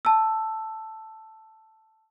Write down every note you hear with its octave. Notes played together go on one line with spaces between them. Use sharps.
A5 E6